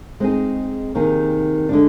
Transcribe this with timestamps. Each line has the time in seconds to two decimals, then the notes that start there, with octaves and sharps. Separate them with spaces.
0.20 G#3 C4 D#4 G#4
0.95 C3 D#3 A#3 D#4 G#4
1.69 D3 G#3 D4